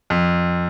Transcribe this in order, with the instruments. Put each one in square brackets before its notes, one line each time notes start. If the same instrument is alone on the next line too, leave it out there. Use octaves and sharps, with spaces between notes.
[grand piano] F2